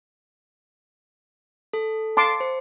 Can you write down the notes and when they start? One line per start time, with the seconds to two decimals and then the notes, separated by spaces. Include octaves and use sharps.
1.73 A4
2.17 A5 C6 D6
2.40 C5